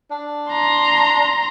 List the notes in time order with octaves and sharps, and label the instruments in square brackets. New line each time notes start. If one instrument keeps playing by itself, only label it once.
[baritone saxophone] D4
[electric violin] A#5 C6